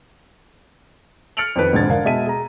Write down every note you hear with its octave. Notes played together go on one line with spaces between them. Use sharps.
F6 A6 C#7 D7 F7 F#7
F2 D#3 B4
E1 F2 G#2 D3 G#6 A6
D3 A#4 F5
B2 G#3 D#5 E5 A5 D#7
G#4 A#5